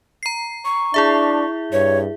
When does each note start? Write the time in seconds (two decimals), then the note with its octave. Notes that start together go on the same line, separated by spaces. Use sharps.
0.23 A#5 C7
0.65 C#6
0.94 D4 E4 G#4 E5
1.72 G2 C#5